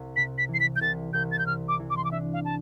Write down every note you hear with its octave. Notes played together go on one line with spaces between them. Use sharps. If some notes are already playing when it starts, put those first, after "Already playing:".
Already playing: C2
C3 B6
B6
E3
C7
B6
G6
C2 A6
C2 G6
A6
G6
C3 F6
D6
E3
D6
C6
D6
D4 E5
F5
A5